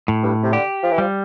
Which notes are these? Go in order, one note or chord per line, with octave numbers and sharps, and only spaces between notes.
A2
G2
C3
D3 G4
F3
E3
F3 G3